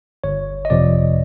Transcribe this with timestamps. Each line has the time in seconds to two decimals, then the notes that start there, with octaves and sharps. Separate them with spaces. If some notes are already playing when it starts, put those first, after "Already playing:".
0.24 G1 C#5
0.65 D#5
0.70 F2 C3 F3 D5